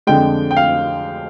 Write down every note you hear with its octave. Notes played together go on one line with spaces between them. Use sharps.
F2 D3 G#3 G5
G5
F5